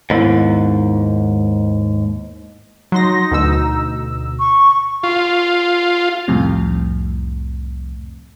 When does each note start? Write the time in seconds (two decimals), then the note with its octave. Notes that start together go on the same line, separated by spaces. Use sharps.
0.10 D#2 G#2 B3 E4
2.92 F#3 D#4 C6 A#6
3.31 D2 B2 E6
4.39 C#6
5.03 F4
6.28 C2 F2 A2 C3